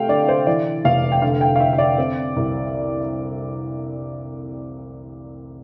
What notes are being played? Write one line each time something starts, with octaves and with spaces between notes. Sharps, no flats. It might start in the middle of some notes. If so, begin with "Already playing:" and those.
Already playing: C3 A3 F5 G5
D3 D5
C5
E3 D5
F1 F5
G5
D3 F5
G5
F5
D3 E5
E5
D5
C4
C2